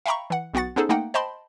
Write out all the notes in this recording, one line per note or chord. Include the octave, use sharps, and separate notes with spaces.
E5 F5 G5 A#5 B5 C#6
E3 F#5
B1 B3 F#4 F#5 A6
B3 C#4 D#4 G#4 A4 C5
A3 A#3 D#4 F#5 G5
C5 D#5 G5 A5 B5 C6